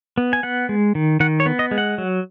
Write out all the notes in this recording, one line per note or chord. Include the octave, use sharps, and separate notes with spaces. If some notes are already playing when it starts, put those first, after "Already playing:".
B3
G#5
B3 F#5
G#3
D#3
D#3 F#5
C#5
B3
D#5
G#3
F#5
F#3